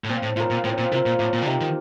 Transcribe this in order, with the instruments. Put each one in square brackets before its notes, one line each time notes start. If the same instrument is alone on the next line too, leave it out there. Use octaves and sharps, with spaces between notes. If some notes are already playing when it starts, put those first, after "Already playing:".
[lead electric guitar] A2
[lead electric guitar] A#2 [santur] C4
[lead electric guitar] A2
[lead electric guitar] A2 [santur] F4 A#4
[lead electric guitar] A#2
[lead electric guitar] A2 [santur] C4
[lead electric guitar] A#2
[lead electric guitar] C3 [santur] F4 A#4
[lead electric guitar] A#2
[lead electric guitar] A2 [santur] A#3
[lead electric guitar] A#2
D3
[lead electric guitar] C3 [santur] D#4 G4
[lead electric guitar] D#3